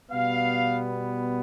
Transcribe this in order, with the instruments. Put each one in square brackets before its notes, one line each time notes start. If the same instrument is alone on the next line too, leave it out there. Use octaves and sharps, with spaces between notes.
[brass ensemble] B2 G3 B3 F5